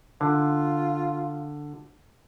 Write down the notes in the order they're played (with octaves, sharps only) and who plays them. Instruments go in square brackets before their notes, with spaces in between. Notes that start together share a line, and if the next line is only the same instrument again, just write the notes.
[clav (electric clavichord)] D3 [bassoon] F4